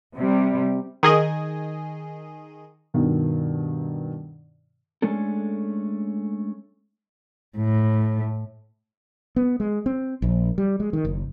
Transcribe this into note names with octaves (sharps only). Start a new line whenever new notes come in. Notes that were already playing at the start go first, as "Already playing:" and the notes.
C3 G3
D#3 G#4 D#5
G2 B2 D#3
G#3 A3 C#4 D4 A4
A2
B3
G#3
C4
A#1
G3
G#3
D#3
F#1